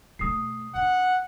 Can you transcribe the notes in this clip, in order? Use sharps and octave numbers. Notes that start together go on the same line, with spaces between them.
B2 A3 D#6 C7
D4 F#5